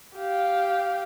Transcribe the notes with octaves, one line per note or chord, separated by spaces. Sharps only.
G4 F5